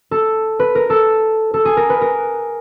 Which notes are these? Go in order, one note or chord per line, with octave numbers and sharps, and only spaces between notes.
A4
B4
A#4
A4
A4
G#4
A#4
B4
A#4